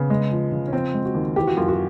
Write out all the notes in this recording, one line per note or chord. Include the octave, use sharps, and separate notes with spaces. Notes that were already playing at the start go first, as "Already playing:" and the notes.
Already playing: C#3 B3
G#3
F3
C#3
C#4
F3 C4
G#3
F#4
D#2
E3 G4
F#4
F#2 F4
F#4